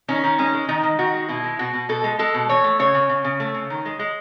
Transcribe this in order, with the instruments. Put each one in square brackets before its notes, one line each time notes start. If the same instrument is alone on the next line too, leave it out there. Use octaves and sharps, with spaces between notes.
[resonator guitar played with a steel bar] D#3 C#4
D#3
G#3 C#4
G#3
D#3 D#4
D#3
D#3 F#4
G#3
B2 E4
G#3
B2 F#4
B2
B2 A4
G#3
G#3 A4
B2
E3 C#5
A3
C#3 C#5
C#3
C#3
C#3
A3
C#3
D#3
G#3
G#3